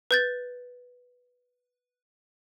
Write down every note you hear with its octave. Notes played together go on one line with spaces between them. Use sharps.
B4 G6 A6